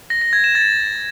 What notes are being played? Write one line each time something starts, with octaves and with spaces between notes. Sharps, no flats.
A#6
A#6
G#6
E7
A6